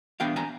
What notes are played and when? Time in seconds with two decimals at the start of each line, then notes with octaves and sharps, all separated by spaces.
0.20 E3 G3 B3 D4 F5 G5
0.36 G#5 A#5